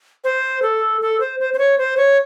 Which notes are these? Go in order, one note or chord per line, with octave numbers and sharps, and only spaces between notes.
C5
A4
A4
C5
C5
C5
C#5
C5
C#5